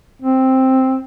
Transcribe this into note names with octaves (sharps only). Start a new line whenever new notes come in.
C4